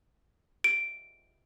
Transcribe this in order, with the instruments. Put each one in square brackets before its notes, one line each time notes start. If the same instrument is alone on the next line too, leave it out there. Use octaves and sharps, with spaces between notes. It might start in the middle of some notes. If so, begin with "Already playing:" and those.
[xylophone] D7